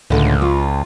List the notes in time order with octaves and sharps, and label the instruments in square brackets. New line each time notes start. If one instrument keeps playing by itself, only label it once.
[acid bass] C#2 [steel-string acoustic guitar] A2 D3
[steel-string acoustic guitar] F4